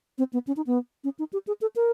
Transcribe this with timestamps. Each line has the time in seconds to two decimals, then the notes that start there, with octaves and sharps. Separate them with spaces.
0.18 C4
0.33 B3
0.47 C#4
0.57 D#4
0.67 B3
1.04 C#4
1.19 D#4
1.33 G4
1.47 G#4
1.61 A4
1.76 A#4